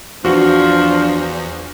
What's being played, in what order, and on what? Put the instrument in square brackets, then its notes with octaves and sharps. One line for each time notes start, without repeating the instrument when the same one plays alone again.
[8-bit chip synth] E2 [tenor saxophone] F3 [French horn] D4 [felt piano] F#4